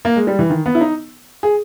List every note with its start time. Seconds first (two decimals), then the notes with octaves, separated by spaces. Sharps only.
0.05 A#3
0.16 G#3
0.27 G3
0.39 E3
0.50 D#3
0.66 B3
0.75 E4
0.81 D#4
1.43 G#4